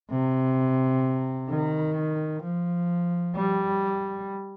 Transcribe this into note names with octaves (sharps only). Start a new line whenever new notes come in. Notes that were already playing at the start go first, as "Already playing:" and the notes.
C3
D#3
F3
G3